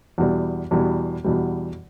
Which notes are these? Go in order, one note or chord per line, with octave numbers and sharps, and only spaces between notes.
E2 B2 G3
E2 B2 G3
E2 B2 G3